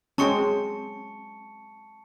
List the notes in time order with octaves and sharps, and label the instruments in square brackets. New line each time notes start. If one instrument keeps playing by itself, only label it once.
[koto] F#3 G#3 C4 [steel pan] C#4 [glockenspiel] A5 C#6 C#7